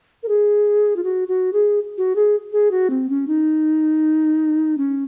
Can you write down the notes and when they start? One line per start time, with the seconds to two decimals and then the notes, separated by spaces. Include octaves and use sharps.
0.23 A#4
0.28 G#4
0.96 F4
1.04 F#4
1.28 F#4
1.53 G#4
1.98 F#4
2.16 G#4
2.53 G#4
2.71 F#4
2.90 C4
3.10 C#4
3.27 D#4
4.78 C#4